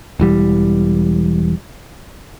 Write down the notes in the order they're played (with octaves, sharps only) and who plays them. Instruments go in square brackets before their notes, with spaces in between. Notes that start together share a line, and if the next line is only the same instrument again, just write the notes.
[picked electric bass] E1 E3 G3